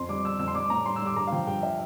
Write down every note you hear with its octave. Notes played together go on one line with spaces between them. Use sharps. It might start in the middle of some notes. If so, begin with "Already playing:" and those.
Already playing: F2 C6
G3 D6
G3 E6
F2 E6
C6
G3 D6
A2 A#5
G3 C6
E6
G3 D6
G2 A#5
F5
F3 G5
G2 G5
E5